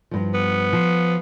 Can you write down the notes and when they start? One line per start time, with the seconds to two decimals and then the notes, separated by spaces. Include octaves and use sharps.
0.11 G2 F3
0.34 B3
0.73 F3